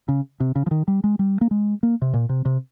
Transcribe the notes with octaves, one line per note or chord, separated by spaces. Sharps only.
C#3
C3
C#3
F3
D#3
G3
G#3
G3
A#3
G#3
A#3
C3
A#2
C3
C3